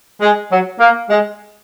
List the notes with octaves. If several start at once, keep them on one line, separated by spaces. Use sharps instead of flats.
G#3
F#3
A#3
G#3